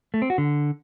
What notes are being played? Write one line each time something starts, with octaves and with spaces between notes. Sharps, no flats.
A3
C4
F#4
D3